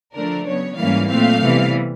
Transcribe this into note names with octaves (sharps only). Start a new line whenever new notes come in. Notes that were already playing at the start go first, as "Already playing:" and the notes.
D3 F3 A3 D4 A#4
C#3 F#3 B3 C#5
G#2 E3 G3 A#3 C#4 F5
A#2 F#3 A3 C4 F5
C3 E3 G3 B3